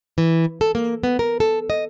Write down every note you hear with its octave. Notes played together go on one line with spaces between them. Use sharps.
E3
A4
A#3
B3
A#4
A4
D#5